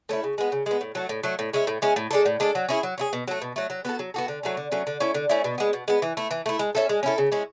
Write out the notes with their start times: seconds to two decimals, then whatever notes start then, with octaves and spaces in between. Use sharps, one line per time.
0.09 A3 C#4 E4
0.24 C#3
0.38 G#3 B3
0.52 C#3
0.66 G#3 B3
0.81 A2
0.95 F#3 A3
1.09 A2
1.23 F#3 A3
1.39 A2
1.53 G#3 C#4 E4
1.67 A2
1.82 G#3 C#4 E4
1.96 A2
2.11 G#3 D4 A4
2.26 A2
2.40 G#3 D4 A4
2.55 F#3
2.69 C#4 E4 G#4
2.83 F#3
2.98 C#4 E4 G#4
3.13 B2
3.28 F#3 A3
3.42 B2
3.56 F#3 A3
3.70 F#3
3.85 B3 F#4 A4
3.99 F#3
4.14 B3 F#4 A4
4.28 D3
4.43 F#3 A3 C#4
4.57 D3
4.71 F#3 A3 C#4
4.87 D3
5.00 A3 C#4 E4
5.14 D3
5.29 A3 C#4 E4
5.44 B2
5.58 G#3 B3
5.73 B2
5.88 G#3 B3
6.02 E3
6.17 A3 E4
6.31 E3
6.46 A3 E4
6.59 G#3
6.75 C#4 E4 A4
6.89 G#3
7.03 C#4 E4 A4
7.18 C#3
7.32 G#3 C#4 E4